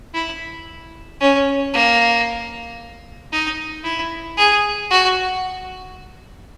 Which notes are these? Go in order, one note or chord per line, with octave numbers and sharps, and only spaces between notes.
E4
C#4
A#3
D#4
E4
G#4
F#4